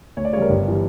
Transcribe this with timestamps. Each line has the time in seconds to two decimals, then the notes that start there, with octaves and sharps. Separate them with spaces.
0.17 D2 C#5
0.25 D5
0.33 C#3 C#5
0.37 G3 A#4
0.49 G1 G4
0.68 E3 G3